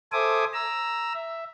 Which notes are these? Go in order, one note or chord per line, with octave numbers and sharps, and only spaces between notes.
A4 C5 E5 G#5 D6 D#6
A#5 E6
E5